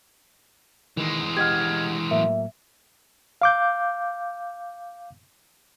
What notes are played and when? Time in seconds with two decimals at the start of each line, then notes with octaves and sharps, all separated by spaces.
0.97 D#3 E3 G#3
1.37 G4 D#5 F#5 F6 G#6
2.11 A2 F#3 A#3 E5
3.42 F5 D6 G6